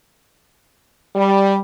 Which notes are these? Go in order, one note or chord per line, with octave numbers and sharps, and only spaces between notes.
G3